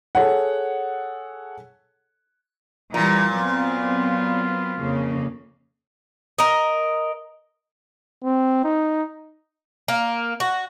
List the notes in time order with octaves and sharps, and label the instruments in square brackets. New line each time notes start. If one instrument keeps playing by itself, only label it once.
[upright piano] G#4 A4 C#5 F#5
[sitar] A#2 [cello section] E3 G3 [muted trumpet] A#5
[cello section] F#3 B3 C4 [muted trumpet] F4
[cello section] F2 C#3 A#3
[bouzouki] A#4 D#5
[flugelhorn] C4
D#4
[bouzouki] A#3
F#4